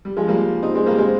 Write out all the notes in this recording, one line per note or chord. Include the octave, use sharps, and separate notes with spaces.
G3
F3 G#3
G3 A#3
C4 D#4
G#3 C4
G3 A#3
G#3 C4